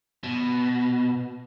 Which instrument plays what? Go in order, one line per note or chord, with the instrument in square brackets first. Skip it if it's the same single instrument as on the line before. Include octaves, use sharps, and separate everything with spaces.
[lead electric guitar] B2